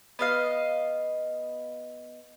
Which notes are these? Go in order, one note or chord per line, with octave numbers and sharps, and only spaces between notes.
B3 D#5 F5